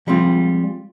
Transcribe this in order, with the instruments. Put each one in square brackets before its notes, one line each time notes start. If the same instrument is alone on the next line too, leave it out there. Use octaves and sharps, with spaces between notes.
[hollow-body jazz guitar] F3 G3 G#3 C4 F4